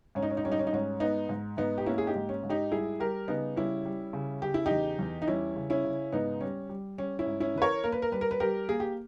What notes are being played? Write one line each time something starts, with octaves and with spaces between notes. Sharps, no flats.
G#2 C#4
D#4
C#4
D#4
G3 C#4
D#4
C#4
D#4
G#2 C#4
G#2 B3 D#4
G#2
G#2 B3 D#4
G4
A#3 C#4 E4
G#4
D#4 G4
G#2
C#4
G#2
D#4 G4
G3 E4 G#4
G3 G4 A#4
C#3 B3 D#4
G3 C#4 E4
G3
C#3
C#3 G4
E4
E2 D#4 G4
E2
D#4
G3 C#4 E4
C#3
C#4 E4
C#3
G#2 B3 D#4
G3 C#4
G3
G3 C#4
C#4 E4
G#2
C#4 E4
E3 B4
A#4 C#5
A#3 A#4
B4
A#4
G3 B4
A#4
B4
G3 G4 A#4
A#3 G#4
G4